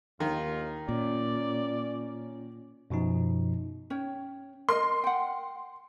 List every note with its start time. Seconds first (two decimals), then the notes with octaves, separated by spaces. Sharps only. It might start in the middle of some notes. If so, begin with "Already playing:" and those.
0.20 D#2 D#3 F4
0.89 A#2 C#4 D5
2.90 F#2 B2 F3 D#4
3.90 C#4 C#5 G5
4.69 A#4 D#5 C6
5.04 F#5 G5